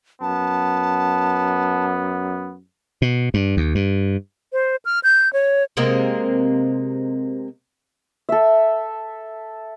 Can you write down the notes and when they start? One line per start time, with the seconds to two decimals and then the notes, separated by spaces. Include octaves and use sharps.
0.21 F#2 B3 A5
3.02 B2
3.34 G2
3.57 D#2
3.75 G2
4.53 C5
4.85 F6
5.04 G6
5.33 C#5
5.77 C3 G#3 A#3
8.29 A4 E5